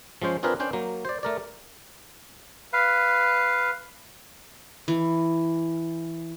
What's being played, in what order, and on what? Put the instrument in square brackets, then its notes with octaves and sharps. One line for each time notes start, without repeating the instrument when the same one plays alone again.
[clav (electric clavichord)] F3 G#3 C#4 C5
C4 D4 F4 G#4 A#4 B4
C#4 D4 C5 G5
F#3 A#3
C5 D5
A3 A#4 D5
[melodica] B4 F5
[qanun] E3